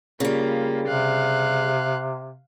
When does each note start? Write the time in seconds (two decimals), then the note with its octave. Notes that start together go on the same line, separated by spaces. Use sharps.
0.20 C#3 G3 A#3 F4
0.88 C3 F5 F#6